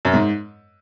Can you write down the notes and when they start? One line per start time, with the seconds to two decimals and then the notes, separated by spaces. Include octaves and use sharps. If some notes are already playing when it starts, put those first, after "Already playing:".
0.05 F#2
0.14 G#2